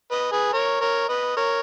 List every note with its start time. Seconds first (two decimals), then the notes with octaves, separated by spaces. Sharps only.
0.11 B4 D#5
0.32 G#4 B4
0.53 A#4 C#5
0.81 A#4 C#5
1.09 B4 D#5
1.37 A#4 C#5